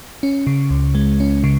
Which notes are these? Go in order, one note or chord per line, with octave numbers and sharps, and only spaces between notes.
C#4
C#3
C#2
G#3
C#4
C#3